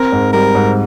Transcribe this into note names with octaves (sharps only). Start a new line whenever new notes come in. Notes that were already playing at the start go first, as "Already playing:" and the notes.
Already playing: C4 A#4
G#2
G3 A#4
G#2